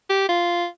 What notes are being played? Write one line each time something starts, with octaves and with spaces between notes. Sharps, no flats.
G4
F4